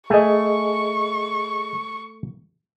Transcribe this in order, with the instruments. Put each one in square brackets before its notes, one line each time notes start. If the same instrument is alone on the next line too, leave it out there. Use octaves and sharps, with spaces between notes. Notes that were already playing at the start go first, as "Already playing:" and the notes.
[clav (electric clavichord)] A3 G#5 [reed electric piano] G#4 D#5 [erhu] C#6